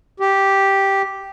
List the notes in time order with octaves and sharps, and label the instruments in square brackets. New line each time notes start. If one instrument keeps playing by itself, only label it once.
[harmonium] G4